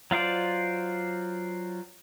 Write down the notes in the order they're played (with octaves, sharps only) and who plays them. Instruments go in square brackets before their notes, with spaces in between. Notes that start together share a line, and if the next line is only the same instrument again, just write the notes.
[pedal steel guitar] F#3 F4 C5 D5